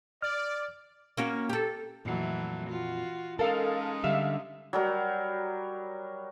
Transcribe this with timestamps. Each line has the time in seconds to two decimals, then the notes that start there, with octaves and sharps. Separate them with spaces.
0.22 D5 F6
1.17 A#3 C#4 F#4
1.50 G4 A4
2.05 F2 A#2 E3 F#3 A3
2.69 F4 F#4
3.39 G#3 C#4 D#4 A4 A#4 F5
4.04 D3 G3 D4 E5 F5
4.73 F#3 G3 A#4